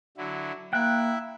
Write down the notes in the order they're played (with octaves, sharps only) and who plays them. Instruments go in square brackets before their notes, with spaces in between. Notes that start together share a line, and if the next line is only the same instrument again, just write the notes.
[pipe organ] D3 F#3 E4
[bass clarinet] A#3 [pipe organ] E4 E5 [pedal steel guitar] G5 F#6